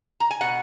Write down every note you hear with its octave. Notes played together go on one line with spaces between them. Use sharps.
A#5
G#5
B2 F#5